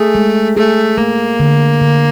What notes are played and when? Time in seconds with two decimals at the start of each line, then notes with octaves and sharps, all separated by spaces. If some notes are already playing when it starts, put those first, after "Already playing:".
Already playing: A3 G#4
0.15 G#3
0.56 A3 G#4
0.97 A3 A#3
1.40 D3
1.81 D3